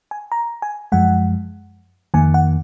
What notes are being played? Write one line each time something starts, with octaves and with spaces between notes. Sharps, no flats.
G#5
A#5
G#5
F#2 F3 G#3 F#5
F2 D#3 A#3 G#5
F#5